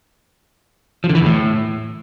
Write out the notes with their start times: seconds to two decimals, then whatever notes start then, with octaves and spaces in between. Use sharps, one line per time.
1.04 F3
1.09 D3
1.15 E3
1.21 E2
1.26 A2